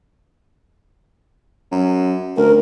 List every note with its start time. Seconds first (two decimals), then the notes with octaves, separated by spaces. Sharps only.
1.72 F#2
2.37 D2 A#4